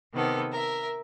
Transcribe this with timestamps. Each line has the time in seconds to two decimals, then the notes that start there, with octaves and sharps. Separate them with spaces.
0.13 C3 D#3 B3 A4
0.51 A#4 E5